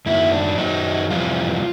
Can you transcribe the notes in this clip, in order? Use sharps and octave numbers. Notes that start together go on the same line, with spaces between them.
F#2 D#3 F#3 E4
D4
F#2 D#3 F#3 D#4
F2 C3 E3 G3 F4